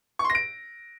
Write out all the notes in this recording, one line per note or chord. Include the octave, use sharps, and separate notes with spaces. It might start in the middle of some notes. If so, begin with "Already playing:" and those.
C#6
C6
A#6
D7